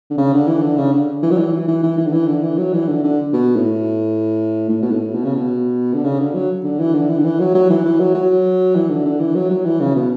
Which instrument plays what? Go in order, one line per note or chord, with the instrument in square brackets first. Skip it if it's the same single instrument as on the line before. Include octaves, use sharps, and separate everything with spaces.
[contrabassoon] D3
C#3
D3
E3
D3
C#3
D3
E3
F#3
E3
E3
E3
E3
E3
D3
E3
D3
E3
F#3
E3
D3
D3
B2
A2
A2
B2
A2
B2
C#3
B2
D3
C#3
D3
F#3
D3
E3
D3
E3
D3
E3
F#3
F#3
E3
E3
F#3
F#3
E3
D3
D3
E3
F#3
F#3
E3
C#3
B2